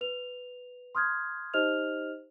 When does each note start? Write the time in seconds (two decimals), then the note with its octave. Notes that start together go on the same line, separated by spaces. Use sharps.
0.01 B4 F7
0.95 C6 D#6 F6 G6 G#6
1.54 D#4 G4 C5 D#5 F6 F7